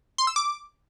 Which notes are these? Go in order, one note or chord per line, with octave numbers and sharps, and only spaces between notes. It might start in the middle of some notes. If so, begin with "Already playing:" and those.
C6
E6
D6